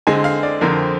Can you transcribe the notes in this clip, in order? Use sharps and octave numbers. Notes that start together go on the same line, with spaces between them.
D3 G#3 C4 G#5
F5
D5
F2 D3 F3 C4 A#4